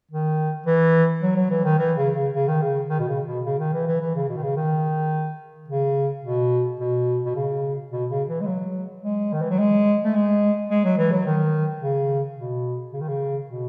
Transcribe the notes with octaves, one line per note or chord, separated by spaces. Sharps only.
D#3
E3
F#3
F#3
E3
D#3
E3
C#3
C#3
C#3
D#3
C#3
D#3
B2
C#3
B2
C#3
D#3
E3
E3
E3
C#3
B2
D#3
C#3
D#3
C#3
B2
B2
B2
C#3
B2
C#3
E3
G#3
F#3
G#3
D#3
E3
F#3
G#3
A3
G#3
G#3
F#3
E3
F#3
D#3
C#3
B2
C#3
D#3
C#3
B2